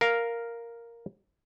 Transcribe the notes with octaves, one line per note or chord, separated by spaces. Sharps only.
A#4 F5